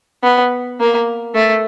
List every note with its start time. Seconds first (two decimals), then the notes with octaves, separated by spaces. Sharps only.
0.23 B3
0.80 A#3
1.34 A3